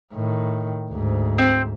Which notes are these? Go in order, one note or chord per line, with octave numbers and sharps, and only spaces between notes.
A2 D#3
D2 G#2
C4